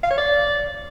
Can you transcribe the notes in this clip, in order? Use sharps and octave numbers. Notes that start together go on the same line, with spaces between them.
F5
C#5
D5